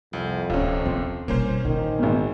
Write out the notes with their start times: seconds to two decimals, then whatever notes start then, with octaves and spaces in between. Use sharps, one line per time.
0.13 C2 F2
0.50 D1 A#1 C3 C#4 F4
0.85 D#2 D#3 C4
1.28 G1 B2 A#3 C#4 C5
1.65 A#1 D3 D#3
1.99 G#1 A#2